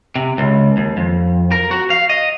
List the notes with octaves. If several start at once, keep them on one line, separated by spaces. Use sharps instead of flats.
C3
C#2
D#2
F2
A#4
F#4
F5
D#5